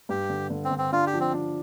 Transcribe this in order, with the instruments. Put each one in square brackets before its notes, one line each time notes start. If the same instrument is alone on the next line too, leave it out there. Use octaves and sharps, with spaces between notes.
[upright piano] G2 [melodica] G4
[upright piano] D3
D3
[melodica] C4
[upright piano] D3
[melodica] C4
[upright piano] D4 [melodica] F4
[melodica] G4
[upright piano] F3
[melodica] C4
[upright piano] D4